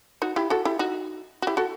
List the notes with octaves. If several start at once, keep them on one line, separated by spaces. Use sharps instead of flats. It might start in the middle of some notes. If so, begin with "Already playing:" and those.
D#4 F#4
E4 G4
F#4 A4
E4 G4
D#4 F#4
F#4
E4 G4
F#4 A4